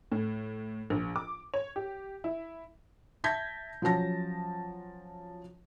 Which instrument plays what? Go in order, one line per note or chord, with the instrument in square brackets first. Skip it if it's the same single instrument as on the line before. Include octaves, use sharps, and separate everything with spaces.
[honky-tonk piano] A2
A#1
D6
C#5
G4
E4
[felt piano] E5 A5 G6 G#6 A#6 B6
F3 F#3 C#4 A5 A#6